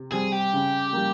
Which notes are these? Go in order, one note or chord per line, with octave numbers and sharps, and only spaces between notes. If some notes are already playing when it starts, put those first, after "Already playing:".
Already playing: C3
G3 C4 G#4
G4
C#3
G3 A#3